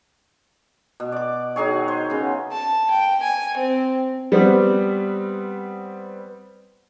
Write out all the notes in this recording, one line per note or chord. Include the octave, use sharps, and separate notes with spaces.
B2
D5 D6
D#3 F#3 G#4 C#5
C5
C#3 B3
A5
G5
G#5
C4
G3 B3 C4